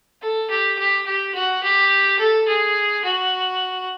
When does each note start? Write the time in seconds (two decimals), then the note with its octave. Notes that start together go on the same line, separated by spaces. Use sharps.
0.22 A4
0.50 G4
0.79 G4
1.06 G4
1.35 F#4
1.63 G4
2.20 A4
2.48 G#4
3.05 F#4